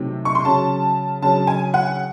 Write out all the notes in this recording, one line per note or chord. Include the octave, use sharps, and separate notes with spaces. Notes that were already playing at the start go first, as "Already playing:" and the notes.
Already playing: C3 D#3 F#3 A3 C4
C#6
C6
C#3 F#3 C#4 A5
C#3 F#3 C#4 A5
G#5
F#5